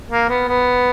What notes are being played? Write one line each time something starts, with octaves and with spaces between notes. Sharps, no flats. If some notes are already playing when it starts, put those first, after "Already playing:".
A#3
B3
B3